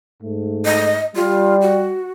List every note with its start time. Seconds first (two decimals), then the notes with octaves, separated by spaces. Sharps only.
0.23 G#2 A3
0.65 D#5
1.16 G3 F4
1.62 F#4